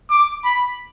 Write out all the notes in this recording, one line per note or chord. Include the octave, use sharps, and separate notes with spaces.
D6
B5